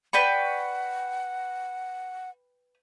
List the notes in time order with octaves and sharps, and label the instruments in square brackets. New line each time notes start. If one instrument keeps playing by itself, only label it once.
[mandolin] B4 G5 C#6 [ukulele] D5 B5 [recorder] F#5